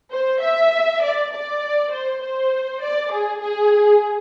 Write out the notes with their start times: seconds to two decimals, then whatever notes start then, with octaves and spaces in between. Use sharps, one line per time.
0.12 C5
0.42 E5
1.02 D5
1.32 D5
1.92 C5
2.22 C5
2.82 D5
3.11 G#4
3.42 G#4